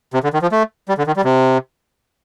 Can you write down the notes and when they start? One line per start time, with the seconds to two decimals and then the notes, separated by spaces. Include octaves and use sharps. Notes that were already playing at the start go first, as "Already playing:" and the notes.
0.14 C3
0.23 D3
0.33 D#3
0.42 F3
0.52 A3
0.89 G3
0.98 D3
1.07 D#3
1.17 G3
1.25 C3